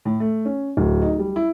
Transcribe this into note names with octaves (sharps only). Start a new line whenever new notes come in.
A2
A3
C#4
D1
D#4
G3
E4